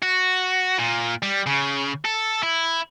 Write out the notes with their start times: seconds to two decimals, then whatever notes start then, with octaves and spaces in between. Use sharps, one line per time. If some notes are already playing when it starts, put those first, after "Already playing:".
0.02 F#4
0.79 A#2
1.23 G3
1.46 C#3
2.05 A4
2.43 E4